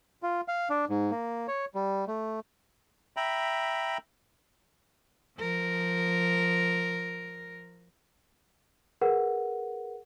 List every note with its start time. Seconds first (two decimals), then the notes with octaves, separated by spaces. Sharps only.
0.23 F4
0.48 F5
0.70 D4
0.89 G#2
1.11 A#3
1.48 C#5
1.75 G3
2.08 A3
3.17 E5 G5 A#5 B5
5.38 F3 A#4
9.01 G#4 A#4 B4 F#5